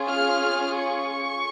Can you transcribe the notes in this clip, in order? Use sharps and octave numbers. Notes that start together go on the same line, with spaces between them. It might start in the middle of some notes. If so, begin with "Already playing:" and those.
Already playing: C#4 F4 G#4
F6
C#6